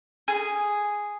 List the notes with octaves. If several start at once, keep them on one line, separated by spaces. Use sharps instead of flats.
G#4